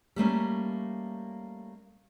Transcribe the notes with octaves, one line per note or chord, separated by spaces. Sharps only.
G3 A3 A#3 C#4